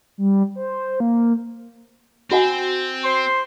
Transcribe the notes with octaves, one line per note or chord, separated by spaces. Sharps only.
G3
C5
A#3
C4 F#4 F#5 G#5
C5 C6